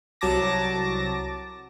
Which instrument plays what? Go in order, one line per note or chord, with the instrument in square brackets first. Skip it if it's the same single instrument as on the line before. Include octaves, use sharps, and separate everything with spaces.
[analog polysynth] C2 F#3 A5 D6 A#6